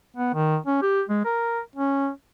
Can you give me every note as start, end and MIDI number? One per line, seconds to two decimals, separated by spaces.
0.16 0.33 59
0.34 0.57 51
0.66 0.78 61
0.82 1.03 67
1.09 1.20 56
1.25 1.60 70
1.76 2.09 61